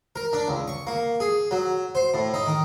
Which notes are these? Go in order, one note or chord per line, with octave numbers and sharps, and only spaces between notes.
A#4
D4
C#2
C#6
A#3
G#4
F#3
C5
A2
D#4
D#3